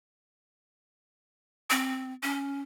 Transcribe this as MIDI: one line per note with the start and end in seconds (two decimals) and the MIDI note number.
1.70 2.13 60
2.23 2.62 61